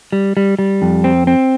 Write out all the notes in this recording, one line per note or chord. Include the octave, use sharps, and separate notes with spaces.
G3
G3
G3
F2
C4
C4